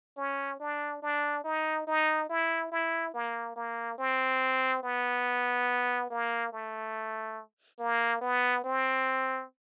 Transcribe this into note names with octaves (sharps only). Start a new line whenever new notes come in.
C#4
D4
D4
D#4
D#4
E4
E4
A#3
A#3
C4
B3
A#3
A3
A#3
B3
C4